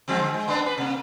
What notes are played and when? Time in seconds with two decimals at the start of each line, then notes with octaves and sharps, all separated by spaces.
0.08 F3 G#3 C4
0.20 D3
0.34 G#3
0.48 A#3 B3 D4
0.66 B4
0.78 C3 A#3